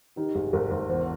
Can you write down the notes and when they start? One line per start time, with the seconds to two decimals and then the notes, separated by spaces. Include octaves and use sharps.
0.16 D#3 G4
0.35 G#1 G#4
0.53 G#1 A#4
0.71 G#1 C5
0.89 E2 C5